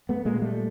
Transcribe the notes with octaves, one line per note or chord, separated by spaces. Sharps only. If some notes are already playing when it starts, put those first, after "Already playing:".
A3 B3
A#2 G#3 A#3
G3 A3